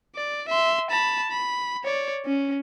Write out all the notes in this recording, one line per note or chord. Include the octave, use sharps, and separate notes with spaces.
D5
E5 C6
A5 B5
B5
C#5 D5
C#4